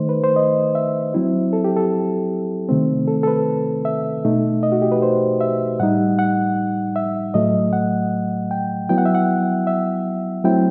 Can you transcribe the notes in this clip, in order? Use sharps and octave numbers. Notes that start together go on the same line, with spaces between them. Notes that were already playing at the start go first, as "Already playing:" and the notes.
Already playing: D#3 A3 D#4 C5
B4
C5
D#5
E5
F#3 C4 E4
A4
G4
A4
C3 D#3 A3 C4
A4
A4
B4
E5
B2 A3 D#4
D#5
F#4
G4
B4
C5
E5
A2 G3 D#4 F#5
F#5
E5
A2 F#3 A3 D#5
F#5
G5
F#3 B3 E4 G5
F#5
E5
F#5
E5
F#3 A3 C4 E4 G5